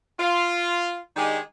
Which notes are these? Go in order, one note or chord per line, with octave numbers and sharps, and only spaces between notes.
F4
D#3 G#3 D4 D#4 G4 G#4